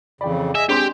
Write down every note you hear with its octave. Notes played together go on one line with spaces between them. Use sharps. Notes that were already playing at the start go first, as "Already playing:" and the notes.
F2 C#3 E3 D5 G5 B5
G#4 D#5 E5 G#5
G#3 C4 D4 G4 G#4 C6